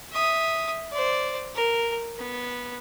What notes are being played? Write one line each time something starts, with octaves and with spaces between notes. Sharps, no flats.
E5 D#6
C5 D5
A#4
B3